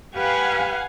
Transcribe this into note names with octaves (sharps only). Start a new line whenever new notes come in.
G4 B4 F5 F#5 G#5